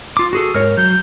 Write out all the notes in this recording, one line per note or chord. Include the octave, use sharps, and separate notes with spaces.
F4 D6
F#4 G#4 A4
G#2 A#4 C#5 F6
F#3 G6